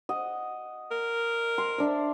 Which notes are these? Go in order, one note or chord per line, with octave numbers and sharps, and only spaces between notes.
D#5 F#5
A#4
C6
D4 E5